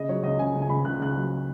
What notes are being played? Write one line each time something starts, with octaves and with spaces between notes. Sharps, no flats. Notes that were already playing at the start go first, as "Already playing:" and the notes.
Already playing: C#3 D#5
F#3 C#5
C#2 D#5
C#3 G#5
C#2
G#5
C#2 B5
C#2 F#6
C#2 F#6
F#3